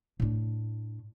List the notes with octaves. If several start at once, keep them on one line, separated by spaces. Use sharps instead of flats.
A2 D4